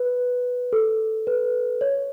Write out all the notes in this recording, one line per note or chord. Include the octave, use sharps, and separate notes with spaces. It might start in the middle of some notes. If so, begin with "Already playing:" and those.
Already playing: B4
A4
B4
C#5